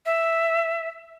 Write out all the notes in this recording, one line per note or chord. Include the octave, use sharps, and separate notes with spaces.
E5